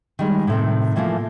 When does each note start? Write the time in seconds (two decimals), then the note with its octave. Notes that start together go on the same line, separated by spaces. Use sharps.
0.19 D#3 G3 G#3
0.47 A2 C3 D#3
0.96 A2 E3 F3 A3 A#3